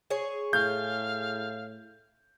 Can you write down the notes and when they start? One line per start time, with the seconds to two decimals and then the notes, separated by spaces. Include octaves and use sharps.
0.10 G#4 C#5
0.53 A2 F5 G6